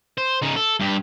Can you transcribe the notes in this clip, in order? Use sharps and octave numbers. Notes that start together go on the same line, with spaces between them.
C5
C#3 D#4
A4
G2 G4